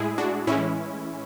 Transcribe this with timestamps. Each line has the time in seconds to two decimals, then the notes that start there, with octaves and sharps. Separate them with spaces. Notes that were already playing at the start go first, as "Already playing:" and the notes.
Already playing: A2 G#3 E4 G#4
0.18 D4 F#4
0.47 A2 E3 G#3 C#4 E4